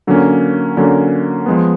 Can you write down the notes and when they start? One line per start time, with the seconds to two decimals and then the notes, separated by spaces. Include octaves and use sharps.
0.07 D3 F#3 A#3 C#4
0.77 D3 F#3 A#3 C#4
1.46 F3 G#3 B3